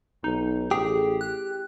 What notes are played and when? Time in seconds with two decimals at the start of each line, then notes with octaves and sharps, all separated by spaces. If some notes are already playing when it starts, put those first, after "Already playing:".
0.24 B1 D#4
0.71 A1 G4 G#4
1.21 F#6